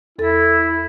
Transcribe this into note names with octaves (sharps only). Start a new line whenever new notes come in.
E2 E4 A4 A6